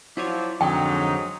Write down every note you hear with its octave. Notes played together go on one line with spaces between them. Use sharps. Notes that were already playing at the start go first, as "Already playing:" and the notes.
F3 F#3 E4 F4 C#5 D5
F2 G#2 D3 F#3 D#4 D5 G5